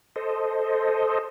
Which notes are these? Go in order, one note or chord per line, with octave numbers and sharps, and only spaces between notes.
A4 C5 D#5